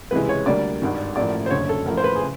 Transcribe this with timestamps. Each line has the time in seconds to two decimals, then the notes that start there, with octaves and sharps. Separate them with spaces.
0.11 C#2 C3 E3 G#3 B4
0.29 C#5
0.46 D2 D3 G3 A#3 D5
0.82 G#1 G2 D#3
1.16 A1 A2 F3 A#3 D5
1.46 C5
1.51 F#1 F#2 D3 C#5
1.69 A4
1.86 A1 A2 F3 A#4
1.97 C5
2.04 B4
2.16 G#4
2.21 C#3